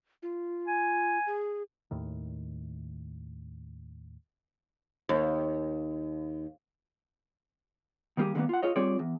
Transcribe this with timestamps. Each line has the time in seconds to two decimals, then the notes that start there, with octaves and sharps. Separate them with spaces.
0.22 F4
0.67 G#5
1.27 G#4
1.91 D#2 A2 D#3
5.09 D#2
8.17 D#3 G3 A#3 D#4 G4 G#4
8.35 D3 D#3 G3 G#3 A#3 B3
8.49 F4 F#5
8.63 F4 G#4 C#5 D#5
8.76 G3 C4 F4 G#4 C#5 D5
8.99 E2